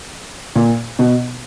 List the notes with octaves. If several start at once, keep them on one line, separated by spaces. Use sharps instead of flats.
A#2
B2